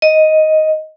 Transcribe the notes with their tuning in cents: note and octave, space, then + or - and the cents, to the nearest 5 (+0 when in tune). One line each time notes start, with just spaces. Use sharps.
D#5 +5